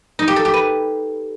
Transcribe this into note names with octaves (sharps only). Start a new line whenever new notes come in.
D#4
G4
A4
G4
B4